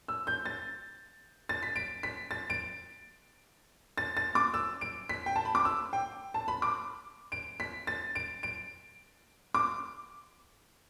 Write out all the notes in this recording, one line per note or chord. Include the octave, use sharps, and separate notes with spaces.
E6
G6
A6
A6
B6
D7
B6
A6
D7
A6
A6
D6
E6
D7
B6
G5
A5
B5
D6
E6
G5
A5
B5
D6
D7
B6
A6
D7
D7
D6